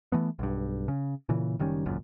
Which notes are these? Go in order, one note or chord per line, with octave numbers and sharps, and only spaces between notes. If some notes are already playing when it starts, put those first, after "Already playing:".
E3 A3 B3
B1 G2
C#3
A#2 C#3 E3
F#1 D#3 G3 C#4
G#1 C#2 F#2 A#2